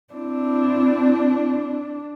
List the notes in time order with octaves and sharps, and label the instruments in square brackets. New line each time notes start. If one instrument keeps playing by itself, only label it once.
[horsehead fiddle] C4 E4 [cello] D4